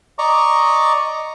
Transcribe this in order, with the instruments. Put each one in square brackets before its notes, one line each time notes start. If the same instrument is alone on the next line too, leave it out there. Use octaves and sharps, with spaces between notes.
[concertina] D5 D#5 A#5 C#6 D6